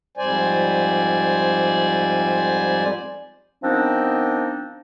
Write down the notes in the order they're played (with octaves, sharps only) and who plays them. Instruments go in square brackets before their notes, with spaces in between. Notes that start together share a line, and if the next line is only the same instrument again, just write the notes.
[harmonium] F2 G#2 G3 C5 D5 G#5
[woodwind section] D#3 F3 B3 C4 D4 D#4